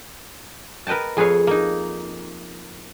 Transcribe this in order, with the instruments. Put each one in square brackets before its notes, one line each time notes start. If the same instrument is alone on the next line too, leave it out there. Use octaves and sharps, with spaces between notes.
[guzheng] A#4 B4 D#5 G5 A5
F2 G#4 B4 C#5 F5
A#3 D#4